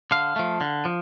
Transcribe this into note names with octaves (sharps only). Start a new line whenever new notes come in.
D3 F5
F3 A3
D3
F3